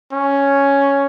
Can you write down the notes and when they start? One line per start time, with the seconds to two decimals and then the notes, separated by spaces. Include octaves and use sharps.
0.13 C#4